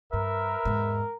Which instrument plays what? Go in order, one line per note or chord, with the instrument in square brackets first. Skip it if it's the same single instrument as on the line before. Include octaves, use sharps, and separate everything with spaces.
[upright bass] G2 [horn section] A#4 [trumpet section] B4 E5
[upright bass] E2 G#2